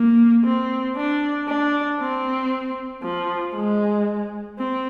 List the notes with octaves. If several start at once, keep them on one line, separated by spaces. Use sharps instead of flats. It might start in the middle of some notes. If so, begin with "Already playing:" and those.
Already playing: A#3
C4
D4
D4
C4
F3
G#3
C4